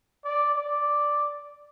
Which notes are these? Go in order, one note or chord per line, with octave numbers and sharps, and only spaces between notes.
D5
D5